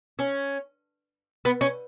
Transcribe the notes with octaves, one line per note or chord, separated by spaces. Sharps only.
C#4
B3
C#4